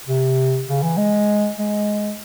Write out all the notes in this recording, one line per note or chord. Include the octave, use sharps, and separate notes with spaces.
C3
C#3
E3
G#3
G#3